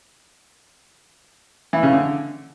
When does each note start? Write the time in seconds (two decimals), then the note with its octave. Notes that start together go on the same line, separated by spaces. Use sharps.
1.73 E3
1.83 C#3
1.93 D3